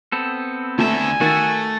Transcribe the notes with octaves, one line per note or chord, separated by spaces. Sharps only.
B3 C4 A4
D2 A3 E5 G#5
D#3 A3 F#4